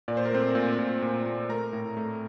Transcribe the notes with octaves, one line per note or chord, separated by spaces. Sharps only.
A#2 D5
C5
A#4
A3 C4 C5
A#2
A#2
A#2
A#2
A3 A#4 A#5
A2
A3